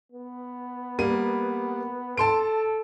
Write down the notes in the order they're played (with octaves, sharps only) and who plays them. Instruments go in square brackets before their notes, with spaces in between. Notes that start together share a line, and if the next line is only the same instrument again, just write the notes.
[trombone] B3
[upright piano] G3 A#3 D#7
[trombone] A4 [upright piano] A5 C6 D7